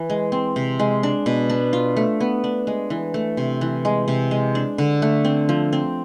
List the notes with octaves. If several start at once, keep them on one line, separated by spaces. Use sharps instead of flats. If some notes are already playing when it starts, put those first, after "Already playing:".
Already playing: E3
G#3
C4
C3
G#3
D4
B2
D4
F4
A3
B3
D4
G#3
E3
A3
C3
E3
G#3
C3
G#3
D4
D3
A3
C4
F3
C4